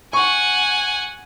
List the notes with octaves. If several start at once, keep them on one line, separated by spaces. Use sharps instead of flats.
F#5 G#5 C#6